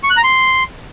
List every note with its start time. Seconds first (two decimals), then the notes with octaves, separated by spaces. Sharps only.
0.03 C#6
0.10 F#6
0.17 A#5
0.24 C6